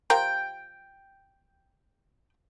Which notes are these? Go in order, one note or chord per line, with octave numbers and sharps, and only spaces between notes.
F3 G4 A#4 G5